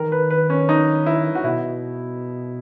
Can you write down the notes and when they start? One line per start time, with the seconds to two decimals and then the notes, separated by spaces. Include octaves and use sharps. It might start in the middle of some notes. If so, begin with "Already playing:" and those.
Already playing: D#3 A#4
0.12 B4
0.30 B4
0.50 C#4
0.69 D#4
1.06 E4
1.35 F#4
1.44 B2 E4